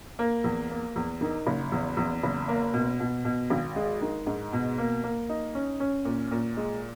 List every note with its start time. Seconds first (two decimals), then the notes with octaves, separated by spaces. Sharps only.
0.19 A#3
0.44 E2
0.70 A#3
0.96 E2
1.21 D#3
1.47 F#1
1.72 E2
1.97 E2
2.23 F#1
2.48 A#3
2.73 B2
3.00 B2
3.25 B2
3.50 G#1
3.76 G#3
4.01 D#3
4.26 G#2
4.53 B2
4.78 A#3
5.04 A#3
5.29 D#4
5.55 C#4
5.80 C#4
6.05 A#2
6.31 A#2
6.57 G#3